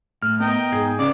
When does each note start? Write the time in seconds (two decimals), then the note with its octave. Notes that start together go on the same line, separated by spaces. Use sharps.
0.22 A2 F6
0.40 B3 A#4 D#5 G5
0.72 G#2 G#4
0.99 C#3 B4 C#5 D5 D6